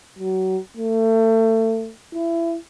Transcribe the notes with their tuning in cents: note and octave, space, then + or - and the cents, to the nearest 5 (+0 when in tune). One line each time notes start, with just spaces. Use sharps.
F#3 +25
A3 +30
E4 +25